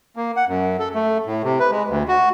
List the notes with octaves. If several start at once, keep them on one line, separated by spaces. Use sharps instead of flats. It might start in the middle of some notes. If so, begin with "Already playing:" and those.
A#3
F#5
F#2
A4
A3
A2
C3
B4
G#3
D2
F#4